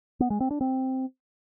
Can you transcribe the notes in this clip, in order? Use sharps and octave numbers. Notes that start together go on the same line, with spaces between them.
B3
G#3
C4
D4
C4